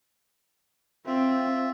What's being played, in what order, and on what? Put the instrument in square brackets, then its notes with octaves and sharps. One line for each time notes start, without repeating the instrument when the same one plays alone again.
[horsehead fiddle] C4 [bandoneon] F4 E5